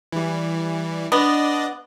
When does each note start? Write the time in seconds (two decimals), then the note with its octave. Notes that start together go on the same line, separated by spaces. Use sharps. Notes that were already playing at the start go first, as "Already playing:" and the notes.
0.12 E3 G3
1.12 B3 D4 D5 D#5